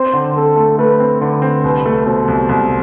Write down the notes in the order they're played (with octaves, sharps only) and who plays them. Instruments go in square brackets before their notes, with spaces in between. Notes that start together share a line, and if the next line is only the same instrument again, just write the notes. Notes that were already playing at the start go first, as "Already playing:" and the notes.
Already playing: [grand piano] C4 [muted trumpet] C5
[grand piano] D3
[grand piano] C4 [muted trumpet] A4
[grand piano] A3
[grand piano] A3 [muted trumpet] B4
[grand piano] C4
[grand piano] D3 [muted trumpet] B4
[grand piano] C4
[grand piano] C2 [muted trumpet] B4
[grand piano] A3
[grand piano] B2 [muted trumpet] C5
[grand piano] C2
C2